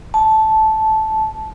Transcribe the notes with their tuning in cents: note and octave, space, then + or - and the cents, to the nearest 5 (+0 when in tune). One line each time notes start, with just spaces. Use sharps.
A5 -10